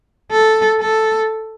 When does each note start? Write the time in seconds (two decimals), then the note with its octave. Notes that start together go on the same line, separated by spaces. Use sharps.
0.32 A4
0.81 A4